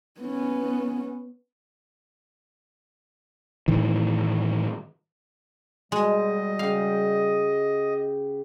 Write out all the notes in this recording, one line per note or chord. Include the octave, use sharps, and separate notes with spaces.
B3 C#4
A2 D#3 E3
B2 G3 G#3 D#5
C#3 G4 F5 F#5